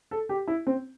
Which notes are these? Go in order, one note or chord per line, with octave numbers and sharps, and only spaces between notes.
A4
G4
E4
C4